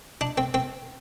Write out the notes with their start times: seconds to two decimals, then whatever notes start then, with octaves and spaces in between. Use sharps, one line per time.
0.21 D4
0.38 C4
0.54 C4